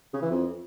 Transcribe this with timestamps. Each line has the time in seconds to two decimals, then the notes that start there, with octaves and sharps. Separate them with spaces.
0.13 C#3
0.22 E3
0.31 F2